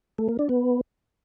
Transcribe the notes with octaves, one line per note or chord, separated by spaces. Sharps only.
A3
A#3
D4
B3